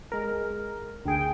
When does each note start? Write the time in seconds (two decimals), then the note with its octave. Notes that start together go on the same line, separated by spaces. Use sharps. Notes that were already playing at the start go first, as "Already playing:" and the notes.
0.12 G#3 A#4
1.05 D2 G#4 G5